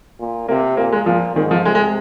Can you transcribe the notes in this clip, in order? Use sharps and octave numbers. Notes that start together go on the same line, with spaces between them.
A#2
C3 A#3
A#2 A#3
G#3
A#2 F3
G#2 D#3
F3
C3 G#3
G#3